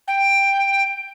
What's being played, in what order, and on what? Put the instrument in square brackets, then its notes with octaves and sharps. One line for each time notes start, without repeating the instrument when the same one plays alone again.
[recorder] G5